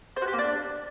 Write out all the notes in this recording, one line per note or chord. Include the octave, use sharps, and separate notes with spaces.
C5
F#4
G4
A#3
D4